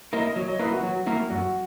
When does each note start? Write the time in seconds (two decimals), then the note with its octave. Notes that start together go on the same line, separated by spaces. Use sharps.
0.13 A#3 E4 A#4 D#5
0.36 F#3 C#5
0.48 D#5
0.59 A#3 E4 A#4 B4
0.72 F#4
0.83 F#3
1.06 A#3 E4 A#4
1.30 F#2 F#4